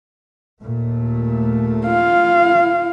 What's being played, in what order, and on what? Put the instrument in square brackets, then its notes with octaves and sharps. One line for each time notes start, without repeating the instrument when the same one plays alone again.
[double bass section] D#2 A#2 A3
[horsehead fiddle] F4 F5